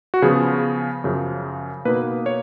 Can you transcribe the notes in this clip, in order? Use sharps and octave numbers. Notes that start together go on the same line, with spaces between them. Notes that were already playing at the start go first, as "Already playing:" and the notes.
F#4
C#3 F3 B3 G#4
F#2 C#3 F3
B2 A#3 D#4 B4
C#5